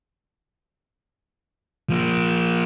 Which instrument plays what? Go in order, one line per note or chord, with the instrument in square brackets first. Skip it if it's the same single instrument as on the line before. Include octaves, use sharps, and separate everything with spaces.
[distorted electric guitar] F3 A#3